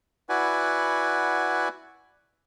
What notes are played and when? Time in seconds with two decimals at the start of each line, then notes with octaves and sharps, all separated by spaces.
0.29 E4 F#4 B4 D5 F#5 G#5